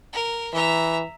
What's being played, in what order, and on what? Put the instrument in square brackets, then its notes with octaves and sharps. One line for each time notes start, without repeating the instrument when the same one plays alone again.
[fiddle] A#4
[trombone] E3 [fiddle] E5 A#5